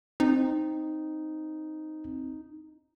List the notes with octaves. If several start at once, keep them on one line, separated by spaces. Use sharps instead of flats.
C4 D#4